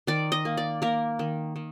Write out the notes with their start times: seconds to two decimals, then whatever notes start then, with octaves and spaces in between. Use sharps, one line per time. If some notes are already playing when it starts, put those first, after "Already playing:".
0.07 D#3 D5
0.32 D#5
0.45 A#3
0.57 D5
0.82 A#3 A#4
1.19 D#3
1.56 D#3